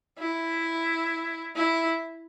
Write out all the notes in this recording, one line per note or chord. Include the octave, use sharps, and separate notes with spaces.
E4
E4